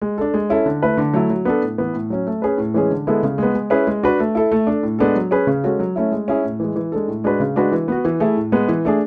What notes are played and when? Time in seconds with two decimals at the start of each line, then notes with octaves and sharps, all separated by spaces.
0.02 G#3
0.18 D4 A4
0.34 G#3
0.50 C#4 E4 A4
0.66 D3
0.82 A3 E4 B4
0.97 D3
1.13 F#3 A3 E4
1.30 F#3
1.45 B3 D4 A4
1.62 A2
1.78 E3 B3
1.94 A2
2.10 F#3 C#4
2.27 A3
2.42 C#4 G#4 B4
2.58 A2
2.74 E3 G#3 C#4 G#4
2.91 D3
3.07 G#3 B3 E4 A4
3.23 C#3
3.38 G#3 B3
3.54 G#3
3.70 C#4 E4 G#4 B4
3.87 G#3
4.03 D4 F#4 B4
4.20 A3
4.35 E4 A4
4.52 A3
4.67 D4 A4
4.83 A2
4.99 G#3 B3 D4 A4
5.15 F#3
5.31 C#4 G#4 B4
5.47 C#3
5.64 G#3 C#4 F#4 A4
5.79 F#3
5.96 A3 C#4 E4
6.12 G#3
6.28 C#4 E4 G#4
6.44 A2
6.60 E3 G#3
6.76 E3
6.92 G#3 D4 A4
7.08 A2
7.24 G#3 D4 F#4 B4
7.40 C#3
7.56 G#3 D4 F#4 B4
7.72 E3
7.88 B3 F#4
8.05 E3
8.20 A3 E4 G#4
8.37 A2
8.52 G#3 B3
8.68 E3
8.85 A3 D4 G#4